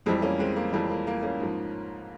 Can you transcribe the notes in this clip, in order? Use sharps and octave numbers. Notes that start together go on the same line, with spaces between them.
F2 E3 G3 G#3 C4
A#3 C#4
G#3 C4
A#3
F2 E3 G3 G#3
A#3
A#3
A#3 C#4
G#2 F3